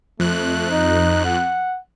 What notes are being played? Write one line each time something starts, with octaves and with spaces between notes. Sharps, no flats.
F2 A3 F#6
D#4
F#5